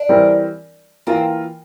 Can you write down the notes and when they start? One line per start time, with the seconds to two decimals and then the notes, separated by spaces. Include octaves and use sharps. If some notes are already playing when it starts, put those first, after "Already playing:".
Already playing: D4
0.09 E3 G3 C4 E4 A#4
1.07 E3 A#3 C4 F4 A#4